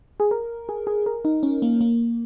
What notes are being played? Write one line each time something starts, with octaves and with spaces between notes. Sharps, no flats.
G#4
A#4
G#4
G#4
A#4
D#4
C#4
A#3
A#3